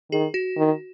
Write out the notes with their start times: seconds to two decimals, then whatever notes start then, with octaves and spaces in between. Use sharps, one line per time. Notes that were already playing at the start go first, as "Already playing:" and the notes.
0.11 D#3 G#4
0.34 F#4
0.57 D#3